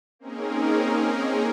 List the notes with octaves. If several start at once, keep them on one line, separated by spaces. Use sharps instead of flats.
A#3 C4 C#4 D#4 G#4 A#4